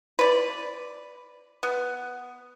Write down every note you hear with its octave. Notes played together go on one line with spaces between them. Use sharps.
B4 D5
B3